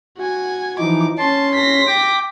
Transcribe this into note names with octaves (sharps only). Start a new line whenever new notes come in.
F#4 G#5
E3 F3 D#4 D6
C#4 A5 C6
A#6 B6
G5 D6